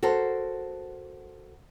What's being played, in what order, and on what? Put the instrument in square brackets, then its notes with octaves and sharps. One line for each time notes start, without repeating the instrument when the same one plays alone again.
[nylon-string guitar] F#4 A4 A#4 C5